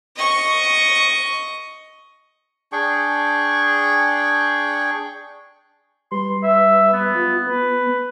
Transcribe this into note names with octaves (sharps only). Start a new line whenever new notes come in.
D#5 C#6
D4 G#4 G5 C#6
G3 B4 C6
E5
B3
F4
B3 B4